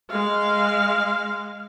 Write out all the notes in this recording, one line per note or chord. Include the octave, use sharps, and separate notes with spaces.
G#3 F5